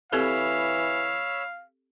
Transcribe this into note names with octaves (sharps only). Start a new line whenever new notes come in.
E3 C4 G4 A4 C#5 F5 B5 E6